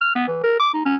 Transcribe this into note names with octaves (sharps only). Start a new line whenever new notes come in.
F6
B3
E3
A#4
D6
D#4
C#4